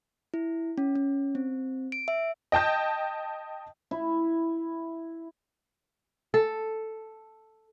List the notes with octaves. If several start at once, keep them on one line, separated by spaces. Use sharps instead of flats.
E4
C#4
C#4
C4
D7
E5
D#5 G5 A5 G6
E4
A4